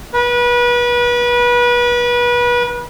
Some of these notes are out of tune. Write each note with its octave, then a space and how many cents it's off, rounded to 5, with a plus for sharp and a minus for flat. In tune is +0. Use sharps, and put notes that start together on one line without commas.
B4 -30